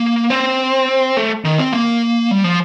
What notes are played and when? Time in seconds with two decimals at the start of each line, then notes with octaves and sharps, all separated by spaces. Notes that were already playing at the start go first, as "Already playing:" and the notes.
Already playing: A#3
0.30 C4
1.17 A3
1.45 D#3
1.58 C4
1.73 A#3
2.31 G3
2.44 F3